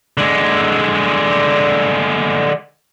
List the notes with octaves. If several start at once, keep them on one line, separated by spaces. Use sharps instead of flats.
D3 G#3